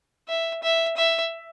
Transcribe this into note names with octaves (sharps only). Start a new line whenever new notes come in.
E5
E5
E5